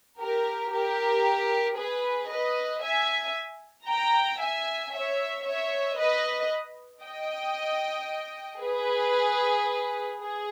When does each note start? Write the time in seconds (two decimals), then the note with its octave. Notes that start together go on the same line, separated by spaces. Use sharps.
0.20 G4 A#4
0.73 G4 A#4
1.78 G#4 B4
2.30 B4 D#5
2.83 E5 G#5
3.88 G5 A#5
4.41 E5 G#5
4.93 C#5 E5
5.46 C#5 E5
5.98 B4 D#5
7.04 D#5 G5
8.61 G#4 B4
10.19 G#4